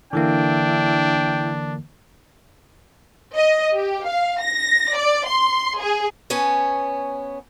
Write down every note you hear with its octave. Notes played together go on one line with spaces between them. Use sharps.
D3 E3 A#3 D4 E4 G5
D#5
G4
F5
A#6
D5
C6
G#4
B3 C#4 C#5 G#5 A5